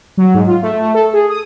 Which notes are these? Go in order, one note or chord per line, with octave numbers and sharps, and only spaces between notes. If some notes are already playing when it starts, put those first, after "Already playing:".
F#3
G#2
F4
A3
A3
A4
G#4
D#6